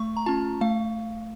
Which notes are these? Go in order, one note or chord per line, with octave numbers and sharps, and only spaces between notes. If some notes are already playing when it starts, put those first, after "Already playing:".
Already playing: A3 C#6
A#5
C#4 F4 A5
A3 F5